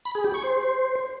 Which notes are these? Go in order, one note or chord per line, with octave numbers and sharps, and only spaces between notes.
B5
G#4
G4
C#6
C5